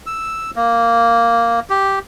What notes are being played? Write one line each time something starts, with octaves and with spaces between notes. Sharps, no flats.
E6
A#3
G4